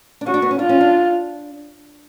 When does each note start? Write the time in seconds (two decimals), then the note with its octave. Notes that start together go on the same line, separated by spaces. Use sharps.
0.21 D4
0.26 C#4 F#4
0.34 D4
0.42 B3
0.51 C#4
0.59 D4 F4
0.69 C#4
0.81 D4